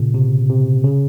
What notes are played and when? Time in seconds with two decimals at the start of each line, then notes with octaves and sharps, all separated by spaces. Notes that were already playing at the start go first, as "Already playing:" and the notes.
Already playing: A#2 C#3
0.14 C3
0.49 C3
0.84 C#3